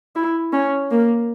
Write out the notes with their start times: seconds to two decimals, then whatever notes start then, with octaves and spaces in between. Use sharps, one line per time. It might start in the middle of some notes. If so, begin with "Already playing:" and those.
0.16 E4
0.53 C#4
0.91 A#3